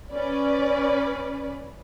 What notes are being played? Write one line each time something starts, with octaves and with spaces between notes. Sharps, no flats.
C#4 B4 D5